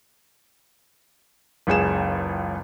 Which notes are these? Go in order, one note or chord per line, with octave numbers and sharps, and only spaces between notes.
F#1 C#2 G#4 E7